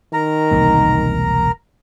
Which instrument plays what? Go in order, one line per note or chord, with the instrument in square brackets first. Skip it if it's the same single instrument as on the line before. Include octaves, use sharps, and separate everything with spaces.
[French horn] D#3 [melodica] A#4 A#5
[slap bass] E1 C2 A#3